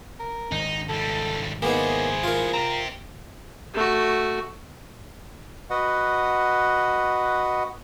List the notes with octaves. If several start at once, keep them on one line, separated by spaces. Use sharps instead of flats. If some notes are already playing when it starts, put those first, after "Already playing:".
A#4
G#1 D#4
C#2 G3 A4
A#3 B3 D#4 E4 G#4 C5
F4 A#4
C4 G4 A#5
A3 F#4
F#4 B4 D#5 F#5